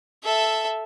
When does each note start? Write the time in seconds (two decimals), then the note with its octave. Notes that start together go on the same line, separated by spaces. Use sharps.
0.24 A4 E5